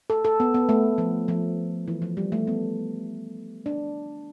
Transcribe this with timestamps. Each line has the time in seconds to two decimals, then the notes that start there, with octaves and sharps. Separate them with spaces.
0.10 A4
0.25 A4
0.40 B3
0.54 B3
0.69 A3
0.98 F3
1.28 F3
1.88 E3
2.02 F3
2.17 G3
2.32 A3
2.47 B3
3.66 D4